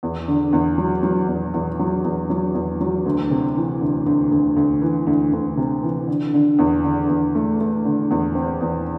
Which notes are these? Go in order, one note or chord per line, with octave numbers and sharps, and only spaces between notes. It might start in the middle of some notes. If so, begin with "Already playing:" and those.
E2
D3
E2
F#3
F#3
E2
E2
F#3
E2
F#3
E2
F#3
D2
C3
E3
D2
D2
D2
D2
E3
D2
D2
C3
E3
D3
D3
E2
D3
E2
A3
A3
D3
E2
C4
E2